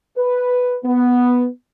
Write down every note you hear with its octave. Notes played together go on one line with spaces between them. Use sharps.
B4
B3